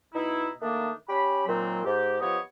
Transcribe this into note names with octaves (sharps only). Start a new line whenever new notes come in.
B2 D#4 E4
D#3 A3 A#3 D4 D#4
C#4 G4 B5
A#2 D#3 F#3 C4
G#2 G4
F3 B3 G4 C#5 D#5